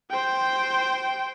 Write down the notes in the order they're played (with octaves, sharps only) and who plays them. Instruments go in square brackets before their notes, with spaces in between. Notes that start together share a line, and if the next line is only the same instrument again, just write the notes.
[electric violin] C5 G5